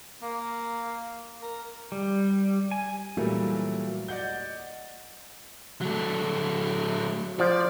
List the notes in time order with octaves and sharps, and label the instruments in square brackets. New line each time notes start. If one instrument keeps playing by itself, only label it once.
[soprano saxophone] A#3
A#4
[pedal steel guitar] G3
G#5
[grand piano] A#2 E3 F#3 G3 A3 A#3
D5 D#5 F#5 G6
[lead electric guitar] F#3 A3
[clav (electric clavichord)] F3 [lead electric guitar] D5